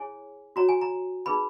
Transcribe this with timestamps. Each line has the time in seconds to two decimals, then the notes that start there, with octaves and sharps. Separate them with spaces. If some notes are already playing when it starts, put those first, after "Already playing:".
Already playing: E4 G#4 C#5 G#5
0.56 F#4 C#5 A#5
0.69 G#5
0.81 A#5
1.26 D#4 G#4 B4 B5